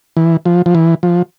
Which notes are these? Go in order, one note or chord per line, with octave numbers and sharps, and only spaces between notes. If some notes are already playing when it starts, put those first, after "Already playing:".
E3
F3
F3
E3
F3